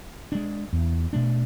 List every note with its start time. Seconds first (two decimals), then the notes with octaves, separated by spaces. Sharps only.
0.32 G#3 D4
0.73 E2
1.13 B2 A3 D4